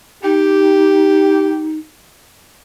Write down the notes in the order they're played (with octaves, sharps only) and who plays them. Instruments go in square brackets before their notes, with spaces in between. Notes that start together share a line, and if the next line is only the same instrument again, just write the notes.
[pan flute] D#4 [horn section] G4